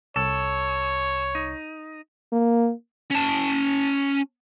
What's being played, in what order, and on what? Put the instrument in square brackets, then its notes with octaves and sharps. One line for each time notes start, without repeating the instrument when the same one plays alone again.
[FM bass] C2 [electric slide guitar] A4 [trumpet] C#5
[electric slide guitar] D#4
[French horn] A#3
[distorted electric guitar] C#4 A5